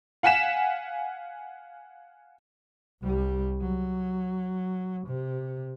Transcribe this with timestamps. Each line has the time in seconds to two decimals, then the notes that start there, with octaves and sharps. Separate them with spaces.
0.23 F5 F#5 G#5 B6 E7
3.03 C2 G3
3.61 F#3
5.07 C3